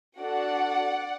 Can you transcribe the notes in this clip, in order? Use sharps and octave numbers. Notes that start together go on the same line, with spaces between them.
D4 F#4 A4 D5 F#5